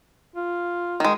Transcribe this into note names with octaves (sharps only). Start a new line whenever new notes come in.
F4
D#3 G#3